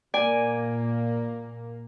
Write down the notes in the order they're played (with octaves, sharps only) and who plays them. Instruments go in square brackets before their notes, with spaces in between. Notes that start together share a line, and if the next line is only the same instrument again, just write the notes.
[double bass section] A#2 A#3 [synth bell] D5 [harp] G#5